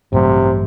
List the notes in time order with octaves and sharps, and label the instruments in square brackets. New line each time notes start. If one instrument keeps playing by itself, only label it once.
[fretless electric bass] A1 G2 F#3 A3 [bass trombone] C3